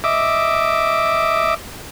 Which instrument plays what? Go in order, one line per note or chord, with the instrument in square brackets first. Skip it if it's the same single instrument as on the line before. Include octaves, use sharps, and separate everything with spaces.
[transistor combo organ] D#5 E5 D6